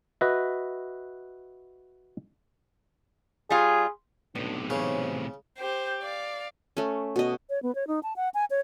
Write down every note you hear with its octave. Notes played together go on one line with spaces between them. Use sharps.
F#4 B4 D#5 E5
G3 F4 G#4
B1 A2 C3 B3 D4
C#3 E3 C5 C#5
G4 C5
D5 F5
A3 C#4
B2 D#5
C#5
B3
C#5
D#4
A5
F#5
G#5
C#5